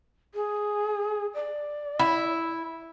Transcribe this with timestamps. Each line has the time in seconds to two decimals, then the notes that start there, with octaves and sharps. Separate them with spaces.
0.35 G#4
1.34 D5
1.99 E4